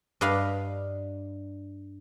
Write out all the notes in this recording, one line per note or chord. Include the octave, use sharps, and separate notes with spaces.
G2 G3 D4 D#5 F5 B5